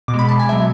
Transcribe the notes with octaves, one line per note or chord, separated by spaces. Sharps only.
B2 D6
G#3
B5
A5
G#5
B2 F#3 E5